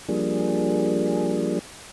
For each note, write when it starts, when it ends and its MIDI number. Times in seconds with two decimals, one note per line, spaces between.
0.08 1.59 53
0.08 1.59 55
0.08 1.59 58
0.08 1.59 62
0.08 1.59 68